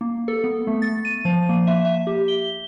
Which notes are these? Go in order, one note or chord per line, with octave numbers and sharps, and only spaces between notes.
A#3
A4
B3
A3
A6
D#7
F3
A#3
E5
E5
G4
G7